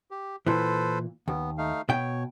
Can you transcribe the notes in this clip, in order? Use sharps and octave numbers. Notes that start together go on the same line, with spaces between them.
G4
A#2 E3 A4 B4 C5
D#2 B3
A3 D#4 F5
B2 C#5 G5